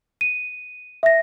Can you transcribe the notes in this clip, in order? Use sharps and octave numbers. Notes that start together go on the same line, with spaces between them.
D#7
E5 A#6